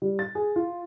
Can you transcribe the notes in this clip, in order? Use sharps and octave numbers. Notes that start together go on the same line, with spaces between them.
G3
A6
G#4
F4